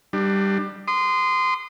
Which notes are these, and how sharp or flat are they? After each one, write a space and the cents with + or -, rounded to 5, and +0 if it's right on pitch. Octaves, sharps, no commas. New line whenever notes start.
G3 +0 D4 +25
C6 -20 D#6 -30